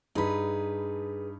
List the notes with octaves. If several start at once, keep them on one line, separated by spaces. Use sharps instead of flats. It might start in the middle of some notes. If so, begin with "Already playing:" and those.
G2 D#4 G#4 B4 B5